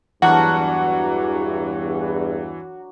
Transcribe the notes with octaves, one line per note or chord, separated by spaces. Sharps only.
E2 G2 E3 F#3 D4 F#4 A#4 F#5